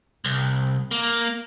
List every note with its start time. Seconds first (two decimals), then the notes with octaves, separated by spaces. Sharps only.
0.25 C2
0.91 A#3